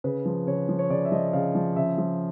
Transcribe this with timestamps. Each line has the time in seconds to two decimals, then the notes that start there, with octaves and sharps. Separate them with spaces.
0.04 C#3 B4
0.26 F3
0.47 C#3 C#5
0.69 F3
0.79 C#5
0.90 C#3 D5
1.05 E5
1.12 F3 D#5
1.33 C#3 F5
1.55 F3
1.76 C#3 E5
1.98 F3